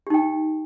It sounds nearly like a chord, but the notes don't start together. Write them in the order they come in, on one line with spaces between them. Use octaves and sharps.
G4 D#4 G5